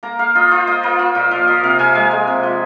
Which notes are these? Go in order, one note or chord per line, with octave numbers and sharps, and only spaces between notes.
A#3 A#5
A#3 F5
F4 D#5
F4 C5
A#3 D#5
A#3
F4
A#2
F3 F5
F3 D#5
C3 F5
C3 G#5
G#3 G#5
G#3
C3
F3